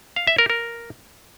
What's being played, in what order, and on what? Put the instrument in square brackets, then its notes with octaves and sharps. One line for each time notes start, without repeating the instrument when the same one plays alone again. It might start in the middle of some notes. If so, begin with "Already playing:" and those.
[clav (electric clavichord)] F5
E5
A#4
A#4